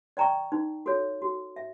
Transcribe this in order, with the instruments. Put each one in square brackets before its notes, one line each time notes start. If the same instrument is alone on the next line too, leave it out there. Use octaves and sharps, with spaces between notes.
[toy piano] D5 G5 A#5 C#6
D#4
F#4 A4 C#5
F#4
E5